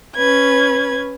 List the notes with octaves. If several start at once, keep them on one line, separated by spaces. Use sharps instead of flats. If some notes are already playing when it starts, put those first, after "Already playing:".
C#4 B4 G#6